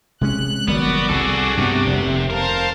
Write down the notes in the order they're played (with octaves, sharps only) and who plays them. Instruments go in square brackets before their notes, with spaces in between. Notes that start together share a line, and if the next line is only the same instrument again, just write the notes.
[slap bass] C3 G#3 C#4 [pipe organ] F#6
[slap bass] F#1 D#3 G3 [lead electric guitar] B3 [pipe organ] F#4 D5
[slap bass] C2 [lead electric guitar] G#4 A4
[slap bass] G2 B3 [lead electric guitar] C3
[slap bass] F1 D#2
[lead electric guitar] A#4 [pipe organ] C5 F5 A5